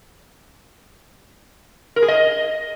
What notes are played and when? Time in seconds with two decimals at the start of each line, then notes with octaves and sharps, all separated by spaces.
1.96 A#4
2.02 G#4
2.08 D#5